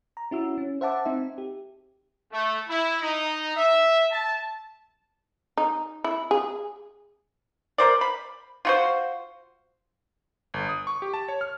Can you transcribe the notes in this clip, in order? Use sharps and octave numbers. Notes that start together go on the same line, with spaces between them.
A#5
C#4 E4 F#4 E6
C#4
C5 E5 F#5 A5 D6
C4 D#4 E5
G4
A3
E4
D#4
E5
A5
D#4
E4
G#4
A#4 C5 D5
B5
F4 F#4 C5
G1
D#6
C#6
G4
A5
C#5
F6